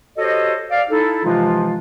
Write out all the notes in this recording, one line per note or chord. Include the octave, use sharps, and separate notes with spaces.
F#4 G4 A4 C5 C#5 D#5
D5 F5
D#4 E4 A4
C3 E3 F3 G#3 D#4 F4